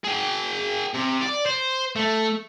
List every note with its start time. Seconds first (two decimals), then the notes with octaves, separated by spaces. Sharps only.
0.05 G#4 G5
0.94 C3
1.21 D5
1.46 C5
1.96 A3